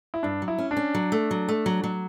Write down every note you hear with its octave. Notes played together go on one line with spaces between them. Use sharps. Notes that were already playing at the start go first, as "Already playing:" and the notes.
E4
G2 D4
F#3
E4
C#4
D4
C#4
F#3
A3
F#3
A3
F#3
F#3